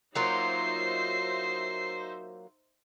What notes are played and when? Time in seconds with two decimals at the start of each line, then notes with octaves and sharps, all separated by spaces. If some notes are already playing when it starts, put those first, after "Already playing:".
0.15 F#3 A#3 D#4 F4 C5 E5 C7